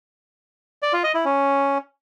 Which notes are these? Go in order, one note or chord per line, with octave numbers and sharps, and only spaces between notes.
D5
F4
D#5
E4
C#4